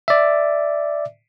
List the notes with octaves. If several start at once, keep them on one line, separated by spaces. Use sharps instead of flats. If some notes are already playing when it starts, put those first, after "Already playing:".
D5 E5